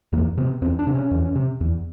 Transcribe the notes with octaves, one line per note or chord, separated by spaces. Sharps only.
E2 A#3
C3 B3
E2 C4
D4
C3
C#4
E2
C3
E2